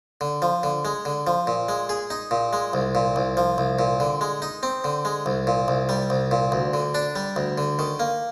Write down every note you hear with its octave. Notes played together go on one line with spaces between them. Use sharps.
D3
F3
D3
G#3
D3
F3
A#2
G#3
G#4
D#4
A#2
G#3
C2
A#2
C2
F3
C2
A#2
D3
G#3
D#4
C4
D3
G#3
C2
A#2
C2
G3
C2
A#2
D2
D3
D4
G3
D2
D3
D#3
A#3